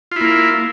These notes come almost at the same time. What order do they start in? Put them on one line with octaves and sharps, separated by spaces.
F4 E4 A#3